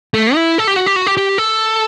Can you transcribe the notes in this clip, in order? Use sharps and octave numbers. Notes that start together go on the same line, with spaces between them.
A3
E4
A4
G4
F#4
G4
F#4
G4
G4
A4